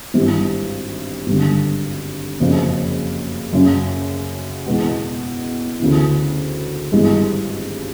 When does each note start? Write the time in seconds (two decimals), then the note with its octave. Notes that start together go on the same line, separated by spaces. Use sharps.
0.14 G#1 G2 E3 G3
1.27 G#1 G2 D3
2.40 F#1 F2 C#3
3.53 F#2 C#3 F#3
4.67 E2 B2 G#3 B3
5.80 D2 C#3 E3
6.92 G#1 G2 E3 G#3